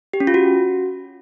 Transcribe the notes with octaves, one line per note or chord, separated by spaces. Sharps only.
G4
C#4
F4
F#4